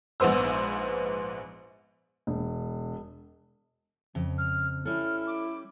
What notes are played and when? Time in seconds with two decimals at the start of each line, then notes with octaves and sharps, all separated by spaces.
0.20 A#1 G#2 B3 C5 E6
2.27 E1
4.15 F2 C#3
4.38 F6
4.85 G3 C#4 E4 A4 F6
5.27 D6